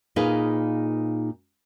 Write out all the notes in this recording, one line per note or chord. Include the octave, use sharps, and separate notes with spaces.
A#2 D#4 G#4 B4 F5